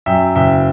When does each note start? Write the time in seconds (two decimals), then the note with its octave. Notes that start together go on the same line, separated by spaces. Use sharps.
0.06 F#2 E5 G5
0.35 F#1 E5 G5